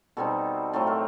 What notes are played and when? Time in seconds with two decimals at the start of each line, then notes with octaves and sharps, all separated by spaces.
0.17 B2 G3 C4 D#4 A4
0.73 A2 F#3 A3 C4 A4
0.87 A#4